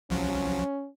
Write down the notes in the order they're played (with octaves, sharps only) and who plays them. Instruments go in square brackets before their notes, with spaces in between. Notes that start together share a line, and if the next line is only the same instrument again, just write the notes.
[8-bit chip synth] C2 F3 F#3 [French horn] C#4